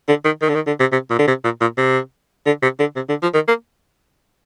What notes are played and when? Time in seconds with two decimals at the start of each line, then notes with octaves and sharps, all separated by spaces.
0.08 D3
0.25 D#3
0.42 D#3
0.49 D3
0.55 D#3
0.67 D3
0.80 C3
0.92 C3
1.10 A#2
1.19 D3
1.27 C3
1.44 A#2
1.61 A#2
1.77 C3
2.46 D3
2.62 C3
2.80 D3
2.96 C3
3.09 D3
3.22 F3
3.34 D#3
3.48 A#3